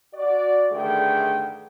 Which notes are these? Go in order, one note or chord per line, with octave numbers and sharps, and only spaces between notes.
F#4 D5
G2 D3 D#3 A3 G#4 G5